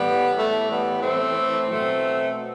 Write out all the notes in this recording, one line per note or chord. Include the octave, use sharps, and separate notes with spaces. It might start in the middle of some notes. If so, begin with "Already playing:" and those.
Already playing: A2 E3 G3 B3
A3
G3 B3
A3 C4
B2 F#3 A3 C4